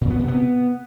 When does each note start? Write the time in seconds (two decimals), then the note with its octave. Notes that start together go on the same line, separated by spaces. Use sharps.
0.01 A#2
0.10 B3
0.19 C3
0.28 B3